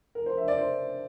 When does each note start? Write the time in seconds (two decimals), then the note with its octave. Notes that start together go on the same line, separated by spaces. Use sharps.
0.15 A#4
0.26 C5
0.37 E5
0.48 D5
0.58 C5